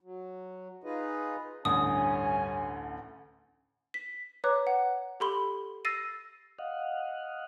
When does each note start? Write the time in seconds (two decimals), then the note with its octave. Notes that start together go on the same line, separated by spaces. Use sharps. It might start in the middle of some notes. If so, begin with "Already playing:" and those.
0.01 F#3
0.84 D#4 F4 G#4 B4 D#5
1.65 A1 D2 G2 C#4 G#5 D#6
3.94 B6
4.44 B4 C#5 A#5 D6 F#6
4.67 F#5
5.20 G4 A4 B5 C6 G7
5.85 E6 A6 A#6 C7 D#7
6.59 D#5 F5 F#5